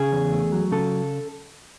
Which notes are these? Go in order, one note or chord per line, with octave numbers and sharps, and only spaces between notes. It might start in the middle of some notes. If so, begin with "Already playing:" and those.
Already playing: C#3 G#4
E2
A3
F#3
C#3 A4